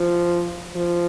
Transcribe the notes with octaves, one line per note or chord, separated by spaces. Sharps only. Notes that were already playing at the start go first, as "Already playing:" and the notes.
Already playing: F3
F3